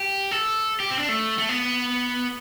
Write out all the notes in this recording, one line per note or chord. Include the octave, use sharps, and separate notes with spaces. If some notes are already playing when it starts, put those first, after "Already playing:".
Already playing: G4
A4
G4
C4
D4
A3
A3
B3